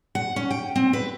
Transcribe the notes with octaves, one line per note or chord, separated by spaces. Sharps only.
F#5
C#4
G5
C4
B4